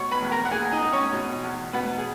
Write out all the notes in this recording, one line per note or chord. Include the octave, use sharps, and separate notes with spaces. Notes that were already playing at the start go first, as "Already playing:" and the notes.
Already playing: B2 C#5 C#6
B4 B5
E2
A#4 A#5
F#5
A#3 G#4 G#5
D#4 D#5
D#4
C#4 C#5
B2
E2
B2 B3 B4
G#4